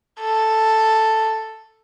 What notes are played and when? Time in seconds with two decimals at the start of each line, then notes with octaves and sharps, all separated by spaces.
0.21 A4